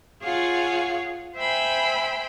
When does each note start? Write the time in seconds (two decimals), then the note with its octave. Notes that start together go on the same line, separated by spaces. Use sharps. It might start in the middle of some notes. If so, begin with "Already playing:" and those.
0.23 F4 G#4 C#5 F5 F#5
1.37 C5 E5 G5 G#5 B5